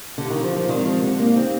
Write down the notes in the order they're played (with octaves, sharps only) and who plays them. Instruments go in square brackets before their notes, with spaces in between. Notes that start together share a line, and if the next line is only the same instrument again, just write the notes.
[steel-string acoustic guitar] D3 [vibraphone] D4 G4 A#4 F5
[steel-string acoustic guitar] D#3
F3
F3
[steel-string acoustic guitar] D#3 [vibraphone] G#3 C4 G4 D5
[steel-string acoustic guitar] F3
D3
[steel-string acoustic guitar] A#3 [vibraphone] D#4 G4 A#4 F5
[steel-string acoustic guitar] C4